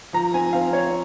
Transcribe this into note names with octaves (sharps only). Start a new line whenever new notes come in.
F3 A#5
C4 G#5
C4 F5
C4 C#5